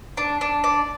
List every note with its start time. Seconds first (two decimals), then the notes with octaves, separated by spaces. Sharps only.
0.17 D4
0.41 D4
0.64 D5